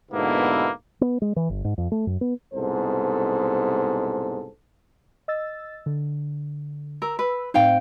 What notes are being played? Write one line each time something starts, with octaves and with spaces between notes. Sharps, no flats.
G#2 B2 D3 A#3 B3 E4
B3
G#3
E3
G1
G#2
F2
A3
F#2
B3
C2 G#2 B2 A4 C5
D#5 E6 A6
D3
A#4 E6
B4
A2 C4 D#4 C5 F5 G5